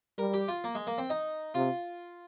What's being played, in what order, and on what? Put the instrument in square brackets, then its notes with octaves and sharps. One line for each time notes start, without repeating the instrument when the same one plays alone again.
[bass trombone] G3 [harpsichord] A#4
[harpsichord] G4
F4
A#3
G#3
A#3
C4
D#4
[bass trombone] C3 [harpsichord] F4